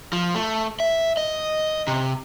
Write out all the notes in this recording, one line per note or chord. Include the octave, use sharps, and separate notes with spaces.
F3
A3
E5
D#5
C3